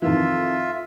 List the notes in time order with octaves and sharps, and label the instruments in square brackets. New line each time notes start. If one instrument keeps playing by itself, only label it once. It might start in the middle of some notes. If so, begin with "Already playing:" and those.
[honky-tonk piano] F2 D#3 E3 [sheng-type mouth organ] F4 E5